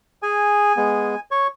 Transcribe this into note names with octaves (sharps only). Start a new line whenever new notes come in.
G#4 G#5
G#3 B3 G#4
C#5 C#6